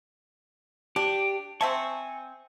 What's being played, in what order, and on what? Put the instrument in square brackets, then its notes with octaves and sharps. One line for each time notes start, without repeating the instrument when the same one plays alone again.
[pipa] D4 [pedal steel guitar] G4
[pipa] C4 E5 A5 [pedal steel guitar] G#5 C#6